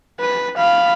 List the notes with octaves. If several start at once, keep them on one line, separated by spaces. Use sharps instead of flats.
B4
F5 B5